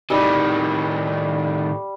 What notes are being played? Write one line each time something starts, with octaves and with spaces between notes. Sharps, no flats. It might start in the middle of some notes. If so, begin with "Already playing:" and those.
A2 D#3 G3 E6